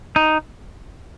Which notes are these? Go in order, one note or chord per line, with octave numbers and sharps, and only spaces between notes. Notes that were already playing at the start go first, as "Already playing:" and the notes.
D#4